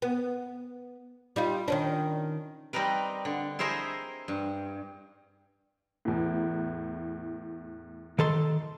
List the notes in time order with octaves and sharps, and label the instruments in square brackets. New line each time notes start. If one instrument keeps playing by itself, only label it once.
[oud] B3
G3 D#4 F4
D#3 C#4 D4
[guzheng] G3 C4 D#4 A#4 B4
D3
E4 G#4 A#4 C5 D#5 E5
G2
[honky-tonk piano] E2 A2
[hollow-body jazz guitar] D#3 A4 C6